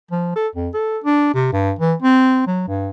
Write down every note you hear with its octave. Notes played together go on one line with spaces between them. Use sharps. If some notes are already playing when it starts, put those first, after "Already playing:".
F3
A4
F2
A4
D4
C3
G2
E3
C4
F#3
G2